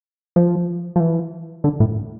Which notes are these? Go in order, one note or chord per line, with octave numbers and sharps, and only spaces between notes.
F3
F3
E3
D3
A2